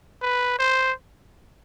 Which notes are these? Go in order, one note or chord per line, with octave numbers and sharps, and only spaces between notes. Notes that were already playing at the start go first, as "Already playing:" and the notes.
B4
C5